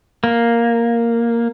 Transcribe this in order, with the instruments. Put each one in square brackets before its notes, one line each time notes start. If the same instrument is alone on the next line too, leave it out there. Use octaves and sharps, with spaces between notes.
[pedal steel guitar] A#3